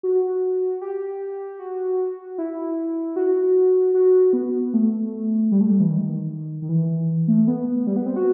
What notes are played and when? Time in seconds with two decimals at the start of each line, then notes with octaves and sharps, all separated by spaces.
0.03 F#4
0.81 G4
1.59 F#4
2.38 E4
3.16 F#4
3.94 F#4
4.33 B3
4.74 A3
5.52 G3
5.61 A3
5.71 G3
5.80 E3
5.90 D#3
6.62 D#3
6.69 E3
7.28 A3
7.48 B3
7.87 G3
7.97 B3
8.06 C4
8.16 F#4